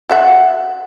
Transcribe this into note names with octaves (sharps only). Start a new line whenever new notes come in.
F#4 E5 F#5